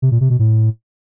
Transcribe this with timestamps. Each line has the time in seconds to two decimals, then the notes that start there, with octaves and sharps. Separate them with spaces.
0.02 C3
0.11 A#2
0.21 C3
0.30 B2
0.39 A2